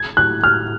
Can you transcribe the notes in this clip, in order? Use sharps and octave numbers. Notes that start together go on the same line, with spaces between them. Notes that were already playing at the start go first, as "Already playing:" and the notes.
Already playing: G#6
F#6
F6